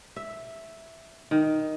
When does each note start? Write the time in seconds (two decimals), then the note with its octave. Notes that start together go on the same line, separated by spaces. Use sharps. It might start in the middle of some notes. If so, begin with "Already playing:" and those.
0.16 E5
1.31 D#3